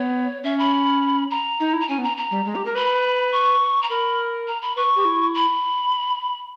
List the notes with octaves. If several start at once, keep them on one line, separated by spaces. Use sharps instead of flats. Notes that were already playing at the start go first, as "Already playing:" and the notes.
Already playing: B3 C#5
C#4 E5
B5
A#5
D#4
E4
A#5
C#4 G#5
B3
A#5
A#5
G3
G#3
G4
A#4
B4 B5
C#6
A#5
A#4 B5
A#5
B5
B4 C#6
G4
E4
B5